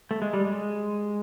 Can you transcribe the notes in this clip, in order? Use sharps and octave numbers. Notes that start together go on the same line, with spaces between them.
A3
G#3
G3
G#3